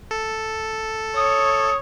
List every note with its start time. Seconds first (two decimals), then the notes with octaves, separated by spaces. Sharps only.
0.11 A4
1.16 C#5 D#6